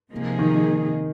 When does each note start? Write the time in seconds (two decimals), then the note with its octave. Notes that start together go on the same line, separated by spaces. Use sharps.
0.12 C3 F3 A#3 D#4 G#4
0.39 D#3